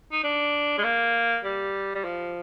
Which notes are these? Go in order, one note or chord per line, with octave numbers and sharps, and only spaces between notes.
D#4
D4
G#3
A#3
G3
G3
F3